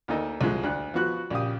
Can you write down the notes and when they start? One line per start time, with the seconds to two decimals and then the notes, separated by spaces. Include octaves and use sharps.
0.08 D2 A#3 D#4 A4 D#5
0.41 C2 F3 G#3
0.63 D2 D4 F#6
0.94 F3 B3 F#4 F#6
1.31 A#1 C#3 G4 F5 D#6